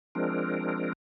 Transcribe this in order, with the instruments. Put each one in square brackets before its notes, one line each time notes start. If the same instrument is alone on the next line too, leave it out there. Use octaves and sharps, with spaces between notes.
[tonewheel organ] F3 G#3 C4 D4 A#4